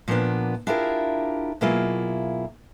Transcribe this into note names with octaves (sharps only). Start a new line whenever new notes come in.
A#2 F3 G3 A#3 B3 D4
D4 E4 F4 G4 G#4 A#4
B2 F#3 A#3 E4 F4 G#4